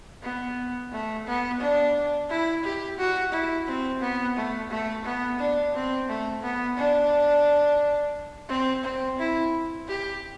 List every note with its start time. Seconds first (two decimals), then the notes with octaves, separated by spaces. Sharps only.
0.23 B3
0.92 A3
1.27 B3
1.60 D4
2.30 E4
2.64 G4
2.98 F#4
3.32 E4
3.67 C4
4.01 B3
4.36 A3
4.71 A3
5.04 B3
5.39 D4
5.74 C4
6.09 A3
6.43 B3
6.78 D4
8.49 C4
8.84 C4
9.19 E4
9.88 G4